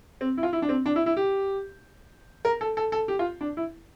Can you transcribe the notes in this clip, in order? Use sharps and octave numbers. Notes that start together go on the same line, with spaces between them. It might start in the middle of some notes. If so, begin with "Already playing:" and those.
C4
E4
F4
E4
D4
C4
D4
E4
E4
G4
A#4
A4
A4
A4
G4
F4
D4
E4